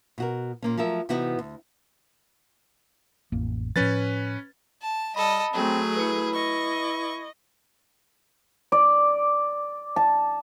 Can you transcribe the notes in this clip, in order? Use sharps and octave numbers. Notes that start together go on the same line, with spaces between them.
B2 F#4 A#4
A#2 A#3 C#4
F3 F#3 A3 A#4 E5
C3 E3 B3 D#4 E4 F#4
D2
A1 F2 A#3
A2 F3 C#4 B4 A6
A5
G3 A4 D#5 B5
F#3 A3 C4 G#4
E4 B4 C#7
D#5 C#6
D5
A5